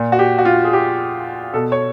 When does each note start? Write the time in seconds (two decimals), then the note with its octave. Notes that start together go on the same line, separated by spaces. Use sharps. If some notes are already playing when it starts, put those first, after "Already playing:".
Already playing: A#2
0.12 F#4
0.19 G4
0.38 F#4
0.45 F4
0.64 G#4
0.73 G4
1.54 B2 A4
1.72 C#5